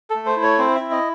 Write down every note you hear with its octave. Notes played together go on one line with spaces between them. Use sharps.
A4
A3
C5
E4
C#5
C4 C5
E5
E4
D#5